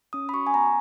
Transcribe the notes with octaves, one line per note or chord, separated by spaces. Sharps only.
C#4 D#6
B5
F#4 C#6
G#5
B3 A#5